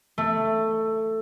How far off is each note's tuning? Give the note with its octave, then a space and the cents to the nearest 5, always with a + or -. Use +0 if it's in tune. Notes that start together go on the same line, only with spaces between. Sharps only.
A3 +10